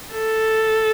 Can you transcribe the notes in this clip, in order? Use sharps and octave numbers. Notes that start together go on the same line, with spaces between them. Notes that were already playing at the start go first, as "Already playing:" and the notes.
A4